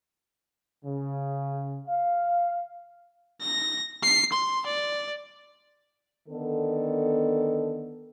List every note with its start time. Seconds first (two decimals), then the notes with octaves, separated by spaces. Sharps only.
0.85 C#3
1.87 F5
3.42 A#6
4.03 C7
4.33 C6
4.66 D5
6.29 D3 D#3 B3 A4